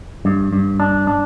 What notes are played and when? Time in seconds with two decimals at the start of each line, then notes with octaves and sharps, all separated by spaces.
0.25 G2
0.52 G2
0.80 D4
1.07 D4